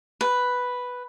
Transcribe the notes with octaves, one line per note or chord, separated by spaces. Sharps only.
B4